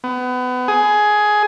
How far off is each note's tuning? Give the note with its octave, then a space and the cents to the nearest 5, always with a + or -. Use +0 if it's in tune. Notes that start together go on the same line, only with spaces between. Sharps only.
B3 +30
G#4 +15